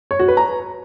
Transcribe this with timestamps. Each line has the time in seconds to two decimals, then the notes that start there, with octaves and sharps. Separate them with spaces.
0.11 C#5
0.19 F#4
0.28 B4
0.37 A#5